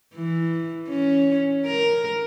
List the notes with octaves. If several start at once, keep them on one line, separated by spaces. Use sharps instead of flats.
E3
C#4
A#4